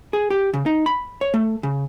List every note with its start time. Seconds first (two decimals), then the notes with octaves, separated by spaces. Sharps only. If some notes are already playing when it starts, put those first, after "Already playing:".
0.13 G#4
0.30 G4
0.54 C#3
0.66 D#4
0.86 B5
1.21 C#5
1.34 A3
1.63 C#3